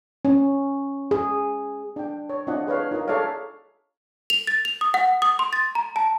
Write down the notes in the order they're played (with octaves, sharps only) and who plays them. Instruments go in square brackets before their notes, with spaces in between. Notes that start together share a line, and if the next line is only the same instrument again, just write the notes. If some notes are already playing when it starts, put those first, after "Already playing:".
[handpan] C#4
G#4
[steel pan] D4 G5
C#5
C4 D4 F4 D#5 F#5
G#4 B4 C#5 F5
D#4 F4 A#4 D#5
G#4 A4 C#5 D5 E5 F5
[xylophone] F7
A6
F7
D#6
F#5
D#6
C6
A6
A#5
A5